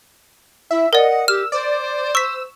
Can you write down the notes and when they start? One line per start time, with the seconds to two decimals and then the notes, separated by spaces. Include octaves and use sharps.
0.71 E4 E5
0.93 A#4 D5 D#5 F#5
1.28 G4 E6 F6
1.52 C5 D5
2.15 C#6 E6 B6